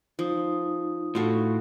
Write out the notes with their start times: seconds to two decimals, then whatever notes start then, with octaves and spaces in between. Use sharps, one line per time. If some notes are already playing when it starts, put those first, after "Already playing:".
0.19 F3 D#4 D#6
1.15 A2 F4 F#4 A4